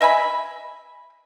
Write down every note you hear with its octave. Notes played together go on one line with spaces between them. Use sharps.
D#5 E5 G#5 B5